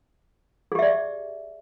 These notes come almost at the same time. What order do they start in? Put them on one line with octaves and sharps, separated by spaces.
G#4 G4 E5 D5